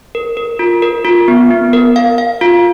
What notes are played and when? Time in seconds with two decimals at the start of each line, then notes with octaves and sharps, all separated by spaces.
0.15 A#4
0.37 A#4
0.59 F4
0.82 A#4
1.05 F4
1.28 B3
1.50 B3
1.73 A#4
1.96 F5
2.18 F5
2.41 F4